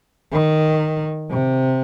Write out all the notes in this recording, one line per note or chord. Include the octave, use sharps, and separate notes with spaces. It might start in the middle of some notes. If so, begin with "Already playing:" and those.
D#3
C3